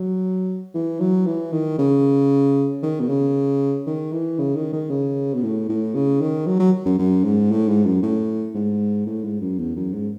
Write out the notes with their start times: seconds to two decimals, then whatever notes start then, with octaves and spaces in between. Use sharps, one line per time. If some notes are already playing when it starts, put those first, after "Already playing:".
Already playing: F#3
0.74 E3
1.00 F#3
1.26 E3
1.53 D#3
1.79 C#3
2.83 D#3
3.00 B2
3.09 C#3
3.87 D#3
4.13 E3
4.39 C#3
4.56 D#3
4.73 D#3
4.90 C#3
5.34 B2
5.43 A2
5.69 A2
5.95 C#3
6.21 D#3
6.47 F#3
6.60 F#3
6.86 F#2
6.99 F#2
7.24 G#2
7.51 A2
7.68 G#2
7.86 F#2
8.03 A2
8.55 G#2
9.06 A2
9.24 G#2
9.41 F#2
9.59 E2
9.76 F#2
9.93 G#2